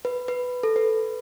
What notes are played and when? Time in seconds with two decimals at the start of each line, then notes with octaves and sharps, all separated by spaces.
0.05 B4
0.28 B4
0.63 A4
0.76 B4